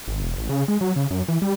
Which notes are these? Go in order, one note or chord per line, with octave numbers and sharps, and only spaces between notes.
G#1
E1
A1
C#3
G#3
F#3
C#3
F#2
E3
G3